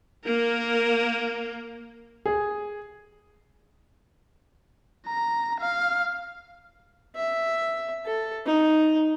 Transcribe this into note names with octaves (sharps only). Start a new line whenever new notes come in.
A#3 A#4
G#4
A#5
F5
E5
A4
D#4